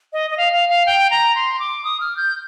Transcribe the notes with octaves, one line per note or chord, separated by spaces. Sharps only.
D#5
D#5
F5
F5
F5
G5
A#5
C6
D6
D#6
F6
G6